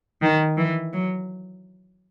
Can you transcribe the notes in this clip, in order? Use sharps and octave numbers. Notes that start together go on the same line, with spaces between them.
D#3
E3
F#3